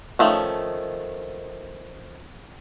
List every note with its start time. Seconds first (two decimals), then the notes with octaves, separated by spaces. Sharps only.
0.19 D#3 F3 A3 C#4